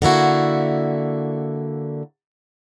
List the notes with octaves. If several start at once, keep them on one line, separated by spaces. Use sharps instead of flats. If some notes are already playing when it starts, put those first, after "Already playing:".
D3 A#3 E4 F#4